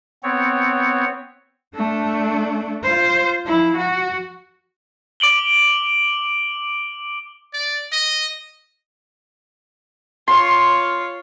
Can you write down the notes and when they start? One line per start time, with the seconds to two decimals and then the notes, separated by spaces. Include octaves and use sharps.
0.23 B3 C4 C#5
1.75 A3 D4
2.83 F4 C5
3.46 F3 E4
3.77 F#4
5.20 D6 D7 F#7 G7
7.53 D5
7.92 D#5
10.28 F4 C#5 C6